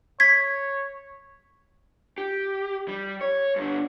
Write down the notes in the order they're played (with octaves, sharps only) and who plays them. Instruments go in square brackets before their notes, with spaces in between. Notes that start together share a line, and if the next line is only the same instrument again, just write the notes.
[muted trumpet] C#5 [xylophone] G#6 B6
[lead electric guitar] G4
G3
C#5
G2 D3